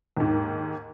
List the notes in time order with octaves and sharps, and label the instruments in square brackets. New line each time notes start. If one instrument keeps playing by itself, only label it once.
[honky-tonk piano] D#2 G#2